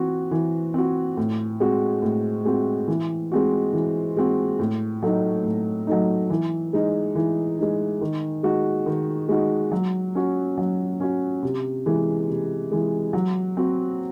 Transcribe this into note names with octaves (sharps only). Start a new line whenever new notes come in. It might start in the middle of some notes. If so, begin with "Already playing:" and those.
Already playing: E3 C4 F#4
E3
C4 F#4
A2
G#3 C4 F#4
A2
G#3 C4 F#4
E3
G#3 C4 F#4
E3
G#3 C4 F#4
A2
F#3 A3 D#4
A2
F#3 A3 D#4
E3
G#3 D#4
E3
G#3 D#4
D#3
G#3 D#4 F#4
D#3
G#3 D#4 F#4
F#3
C#4 F#4
F#3
C#4 F#4
C3
E3 G#3
C3
E3 G#3
F#3
C4 F#4